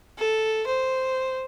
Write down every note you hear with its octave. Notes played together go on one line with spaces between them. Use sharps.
A4
C5